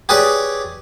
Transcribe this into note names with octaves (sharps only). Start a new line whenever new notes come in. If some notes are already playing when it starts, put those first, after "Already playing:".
G4 G#4 B4 C#5 D5